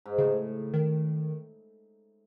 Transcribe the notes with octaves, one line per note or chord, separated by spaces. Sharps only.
G#2
A2 C#3
D#3